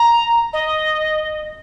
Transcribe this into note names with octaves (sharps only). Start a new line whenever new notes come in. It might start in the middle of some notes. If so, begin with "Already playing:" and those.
Already playing: A#5
D#5